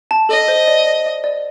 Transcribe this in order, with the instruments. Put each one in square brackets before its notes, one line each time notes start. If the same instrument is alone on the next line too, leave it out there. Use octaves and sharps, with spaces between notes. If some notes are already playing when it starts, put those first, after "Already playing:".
[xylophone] A5
[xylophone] A4 [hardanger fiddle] D#5
[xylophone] C5
D5
D5
D5
D5